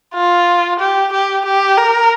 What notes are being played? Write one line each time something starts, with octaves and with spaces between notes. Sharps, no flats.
F4
G4
G4
G4
A#4